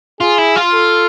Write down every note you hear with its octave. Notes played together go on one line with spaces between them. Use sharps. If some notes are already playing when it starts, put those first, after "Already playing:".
F4 G#4
E4
F4
A4